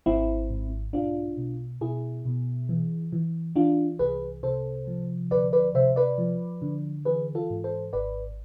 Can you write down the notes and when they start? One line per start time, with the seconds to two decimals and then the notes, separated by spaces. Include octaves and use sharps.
0.06 G#1 C4 E4
0.50 G#2
0.93 B1 D4 F4
1.37 B2
1.81 B2 E4 G#4
2.25 B2
2.69 E3
3.13 E3
3.56 E3 D4 F4
3.99 C2 G#4 B4
4.43 C3 A4 C5
4.87 F3
5.31 D2 B4 D5
5.53 B4 D5
5.74 C3 C5 E5
5.96 B4 D5
6.18 F3
6.62 D3
7.05 E3 G#4 B4
7.35 F4 A4
7.50 G#2
7.64 A4 C5
7.93 G#1 B4 D5